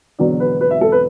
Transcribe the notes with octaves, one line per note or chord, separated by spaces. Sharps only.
E1 E2 D3 F#3 D5
B4
B4
E5
A4
B4